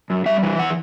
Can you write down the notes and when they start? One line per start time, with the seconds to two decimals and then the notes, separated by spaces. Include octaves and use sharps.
0.10 F#2
0.26 G3 E5
0.43 E3
0.59 F#5